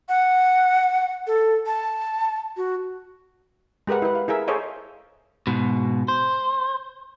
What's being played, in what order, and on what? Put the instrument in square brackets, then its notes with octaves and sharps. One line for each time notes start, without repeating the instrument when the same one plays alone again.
[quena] F#5
A4
A5
F#4
[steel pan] G#3 G4 A#4 B4 F#5
E4 B4
F5
E4 G#4 A#4 E5
G#4 A4 C5 C#5 D#5 F5
[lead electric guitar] G#2 B2
C5